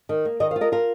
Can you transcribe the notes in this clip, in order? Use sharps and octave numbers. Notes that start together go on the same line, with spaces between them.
D#3
A#3
D#3 A#4 D#5
C5 F5
F4
A#4 D#5
F4 A#4